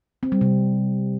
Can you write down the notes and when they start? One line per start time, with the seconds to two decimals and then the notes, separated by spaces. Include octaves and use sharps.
0.23 C4
0.32 G3
0.41 C3